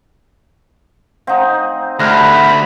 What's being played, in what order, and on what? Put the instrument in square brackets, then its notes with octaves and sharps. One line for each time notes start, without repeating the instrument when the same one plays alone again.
[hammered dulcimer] C4 D#4 [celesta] F5 F#5
[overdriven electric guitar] D2 [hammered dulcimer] C3 G3 A3 [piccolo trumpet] B5 [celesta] F6 F#6 A#6